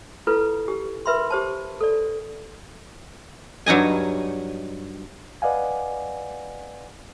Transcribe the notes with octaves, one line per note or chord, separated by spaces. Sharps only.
E4 F4 A4 B4
G4
A#4 B4 E5 B5 C6
G4 C5 A5
A4 D5
G2 F#3 D#4 D#5 G#5
B4 D5 D#5 F5 F#5 G#5